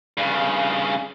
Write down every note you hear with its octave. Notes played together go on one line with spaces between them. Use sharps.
G2 C#3